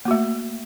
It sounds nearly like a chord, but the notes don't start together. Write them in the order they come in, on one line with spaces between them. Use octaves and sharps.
A#3 F#4 A3